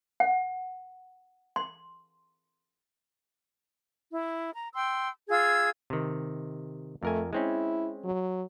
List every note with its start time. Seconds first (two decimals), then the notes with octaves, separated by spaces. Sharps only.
0.20 F#5
1.56 C6
4.12 E4
4.53 A#5
4.75 G5 C6 E6
5.30 F4 G#4 E6 G#6
5.90 C3 D#3
7.03 F2 A3 A#4 G#5
7.33 G#3 C4 C#4 E4
8.04 F#3